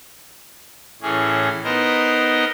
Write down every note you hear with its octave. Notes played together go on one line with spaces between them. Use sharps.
A2 E3 C#4 G#4
B3 D#4 A#4 C5 D#5